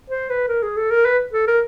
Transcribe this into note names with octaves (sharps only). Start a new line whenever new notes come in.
C5
B4
A#4
G#4
A4
A#4
B4
A4
A#4